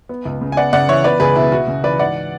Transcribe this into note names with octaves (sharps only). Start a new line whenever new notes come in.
B3
C#2
C#3
G#5
B3 D5 F#5
C#3 D5 F#5
E3 C#5 E5
B3 B4 D5
C#2 G#4 B4
B2 E4
E4 F#4
C#3
E3 B4 D5
G#2 D5 F#5